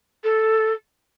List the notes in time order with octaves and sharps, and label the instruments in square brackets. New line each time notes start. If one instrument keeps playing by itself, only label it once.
[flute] A4